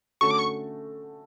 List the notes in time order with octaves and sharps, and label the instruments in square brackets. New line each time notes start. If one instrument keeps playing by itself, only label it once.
[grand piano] D3 A3 C#4 F#4 A4 [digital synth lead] C#6
[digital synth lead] D6
C#6